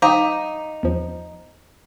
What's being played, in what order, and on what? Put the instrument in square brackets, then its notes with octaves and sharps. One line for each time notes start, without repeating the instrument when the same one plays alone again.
[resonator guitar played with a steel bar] D#4 [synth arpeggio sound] C5 G5 A#5 [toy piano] F5 D6
[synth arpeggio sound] E2 F3